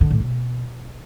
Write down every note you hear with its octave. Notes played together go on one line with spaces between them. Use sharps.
D3
A2
B2